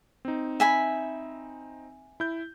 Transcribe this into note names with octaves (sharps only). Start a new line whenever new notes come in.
C4 D#4
E5 G#5 B5
E4 G6